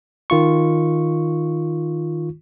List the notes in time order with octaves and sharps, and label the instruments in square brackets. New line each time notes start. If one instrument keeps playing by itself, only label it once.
[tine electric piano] D#3 F4 C#6